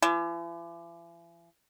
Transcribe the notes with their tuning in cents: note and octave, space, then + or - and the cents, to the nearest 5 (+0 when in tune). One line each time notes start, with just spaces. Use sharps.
E3 +45